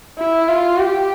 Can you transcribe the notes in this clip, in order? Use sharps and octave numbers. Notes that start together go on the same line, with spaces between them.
E4
F4
G4